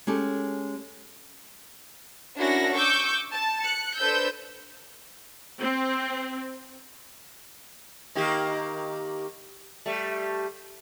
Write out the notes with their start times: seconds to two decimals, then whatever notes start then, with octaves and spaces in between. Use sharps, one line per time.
0.07 G#3 C#4 G4 A4
2.37 C#4 D4 E4 F#4 A#4 A#6
2.75 C#6 D6 E6 G6
3.31 A5
3.62 F#6 C#7
3.98 D4 A4 B4 C5 E6 G6
5.60 C4
8.15 D#3 A#3 G4
9.86 G3 A3